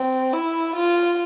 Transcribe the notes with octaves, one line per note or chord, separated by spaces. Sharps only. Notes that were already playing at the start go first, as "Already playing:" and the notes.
Already playing: C4
E4
F4